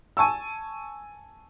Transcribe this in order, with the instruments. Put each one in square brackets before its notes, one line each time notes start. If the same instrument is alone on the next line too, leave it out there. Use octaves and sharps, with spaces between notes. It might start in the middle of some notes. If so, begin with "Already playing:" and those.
[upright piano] G#5 A5 C#6 E6